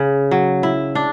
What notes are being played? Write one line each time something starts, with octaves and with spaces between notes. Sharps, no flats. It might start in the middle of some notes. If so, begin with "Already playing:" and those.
Already playing: C#3
F#3
E4
D4